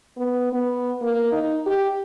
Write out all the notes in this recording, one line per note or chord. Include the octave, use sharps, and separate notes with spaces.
B3
B3
A#3
D#4
G4